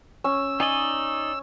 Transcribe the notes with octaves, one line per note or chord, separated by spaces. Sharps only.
C#4 E6
D#4 D5 D#5 G#5